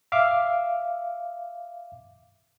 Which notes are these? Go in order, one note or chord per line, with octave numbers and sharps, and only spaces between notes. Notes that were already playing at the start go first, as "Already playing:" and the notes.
E5 F5 D6